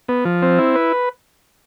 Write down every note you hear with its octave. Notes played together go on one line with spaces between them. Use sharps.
B3
F3
C4
E4
B4